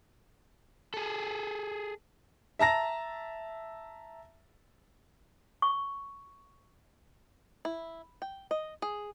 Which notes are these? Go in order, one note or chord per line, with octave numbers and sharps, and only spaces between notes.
G#4 A4
E5 A5 A#5 A#6
C#6
E4
G5
D#5
G#4